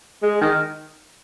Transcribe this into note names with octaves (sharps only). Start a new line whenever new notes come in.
G#3
D#3